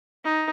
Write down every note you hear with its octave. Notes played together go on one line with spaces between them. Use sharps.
D#4